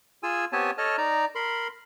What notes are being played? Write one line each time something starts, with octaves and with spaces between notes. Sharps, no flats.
F4 G#4 G#5 E6
B3 C4 G4 C#5 G#5 A5
A4 C#5 D#5 A5 F6
D#4 D5 A#5
A#4 B5 C6